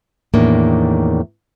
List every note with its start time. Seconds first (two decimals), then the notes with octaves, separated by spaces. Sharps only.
0.34 E2 A2 D#3 A#3 D4